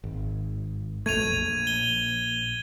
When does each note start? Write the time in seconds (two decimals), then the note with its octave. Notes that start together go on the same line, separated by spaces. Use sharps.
0.04 G#1
1.06 B1 F2 A3 G#6 D#7 F7
1.27 A#1
1.67 G7